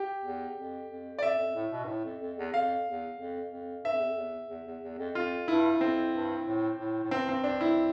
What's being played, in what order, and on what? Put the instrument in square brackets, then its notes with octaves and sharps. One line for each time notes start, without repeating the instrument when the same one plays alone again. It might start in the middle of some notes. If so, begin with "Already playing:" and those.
Already playing: [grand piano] G4
[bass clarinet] E2
F2
F2
[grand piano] D5
[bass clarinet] F2 [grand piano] E5
[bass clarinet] F2
A2
B2
G2
A2
F2
F2
E2
[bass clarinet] F2 [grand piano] F5
[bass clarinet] E2
F2
F2
[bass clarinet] G2 [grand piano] E5
[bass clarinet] F2
E2
F2
E2
E2
E2
E2
F2
[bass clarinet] F2 [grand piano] F4
[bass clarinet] G2 [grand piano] E4
[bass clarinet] F2 [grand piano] C4
[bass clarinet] G2
A2
A2
A2
[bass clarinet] G2 [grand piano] C4
[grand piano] C4
D4
E4